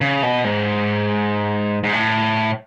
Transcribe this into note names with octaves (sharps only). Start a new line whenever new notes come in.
C#3
B2
G#2
G#2
A2